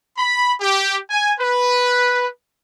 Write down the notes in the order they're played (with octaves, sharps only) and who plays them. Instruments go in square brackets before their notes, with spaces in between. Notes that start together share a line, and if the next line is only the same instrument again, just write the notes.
[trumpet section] B5
G4
G#5
B4